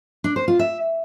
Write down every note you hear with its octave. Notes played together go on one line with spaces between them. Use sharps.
D4
C5
F4
E5